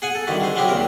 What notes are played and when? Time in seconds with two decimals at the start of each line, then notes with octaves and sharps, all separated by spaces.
0.02 G#4 F#5 G#5
0.15 A4
0.27 C2 D3 D#3 E4 F#4
0.40 G#3 C5
0.55 F#3 G#3 C4 E4 F#4 G4
0.68 D#2 A#2 A#4